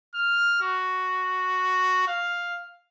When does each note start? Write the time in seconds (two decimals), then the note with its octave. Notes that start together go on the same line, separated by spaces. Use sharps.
0.14 F6
0.61 F#4
2.08 F5